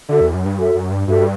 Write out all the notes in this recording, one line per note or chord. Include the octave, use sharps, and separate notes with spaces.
D3 F#4 A4 E5
E2
F#2
G2
F#2 F#4 A4 E5
F#2
G2
G2 F#4 A4 E5